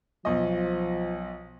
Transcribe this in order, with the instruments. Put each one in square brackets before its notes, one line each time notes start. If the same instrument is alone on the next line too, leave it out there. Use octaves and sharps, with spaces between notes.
[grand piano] B1 D#5 [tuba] F3